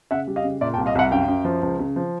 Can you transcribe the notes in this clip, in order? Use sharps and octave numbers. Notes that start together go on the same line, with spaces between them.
C#3 E5 F#5
G3
D#5 F5
C#3
A#2 D5 E5
G5 A5
C2
D#5 F5
C2 E5 F#5
F#2 F5 G5
F#2
F3
C#2
C#3
F3